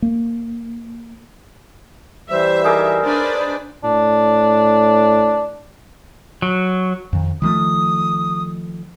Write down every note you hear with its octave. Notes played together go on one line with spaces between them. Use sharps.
A#3
E3 G3 C5 E5
D#4 G#4 A#4 D6
D4 B4 C5 D5
A2 D4
F#3
F2 D#3
D#3 F3 A3 D#6